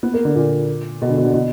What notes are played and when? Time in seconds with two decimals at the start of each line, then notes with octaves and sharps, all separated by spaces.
0.03 B3
0.14 A#3
0.25 D3
0.35 A#2
1.02 B2
1.09 D3
1.18 B2
1.25 D3
1.34 B2